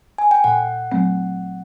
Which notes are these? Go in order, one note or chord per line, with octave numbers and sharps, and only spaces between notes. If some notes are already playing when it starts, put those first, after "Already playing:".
G#5
G5
A#2 F#5
F#3 A3 C4